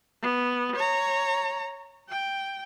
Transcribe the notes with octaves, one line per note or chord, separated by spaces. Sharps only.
B3
C#5 A#5
G5